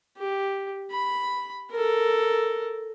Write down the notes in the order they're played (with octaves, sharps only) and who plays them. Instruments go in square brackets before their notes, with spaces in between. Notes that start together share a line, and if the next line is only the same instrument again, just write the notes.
[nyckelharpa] G4
B5
A4 A#4